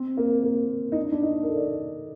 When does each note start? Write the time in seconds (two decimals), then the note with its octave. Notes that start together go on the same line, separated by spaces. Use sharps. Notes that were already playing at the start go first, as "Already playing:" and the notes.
Already playing: C4
0.17 A#3
0.43 A#3
0.92 D#4
0.96 D4
1.12 D4
1.23 D#4
1.43 A#4
1.49 A4
1.56 D5